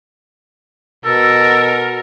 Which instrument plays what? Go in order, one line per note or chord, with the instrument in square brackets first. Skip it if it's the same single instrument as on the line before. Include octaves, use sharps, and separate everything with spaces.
[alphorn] B2 [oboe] A4 [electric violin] A#4